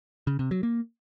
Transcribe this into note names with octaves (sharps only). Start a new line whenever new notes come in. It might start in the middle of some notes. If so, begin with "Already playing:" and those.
C#3
C3
F#3
A#3